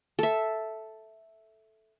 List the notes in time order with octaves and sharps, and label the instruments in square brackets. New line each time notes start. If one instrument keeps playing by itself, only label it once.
[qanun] A4 E5